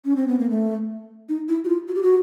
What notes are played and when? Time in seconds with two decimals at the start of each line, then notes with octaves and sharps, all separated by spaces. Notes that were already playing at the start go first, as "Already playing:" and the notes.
0.05 C#4
0.16 C4
0.28 B3
0.39 A#3
0.50 A3
1.29 D#4
1.49 E4
1.65 F#4
1.68 F4
1.88 F#4
1.95 G4
2.03 F#4